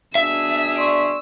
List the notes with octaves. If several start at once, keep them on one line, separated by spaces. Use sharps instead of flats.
B2 D4 G#4 E5 E6
D5 C6 C#6